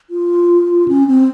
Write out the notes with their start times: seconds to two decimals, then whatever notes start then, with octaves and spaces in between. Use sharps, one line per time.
0.10 F4
0.88 C#4
1.07 C4